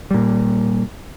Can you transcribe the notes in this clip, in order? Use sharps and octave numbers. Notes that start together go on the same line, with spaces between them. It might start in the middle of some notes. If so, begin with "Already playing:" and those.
A#2 G3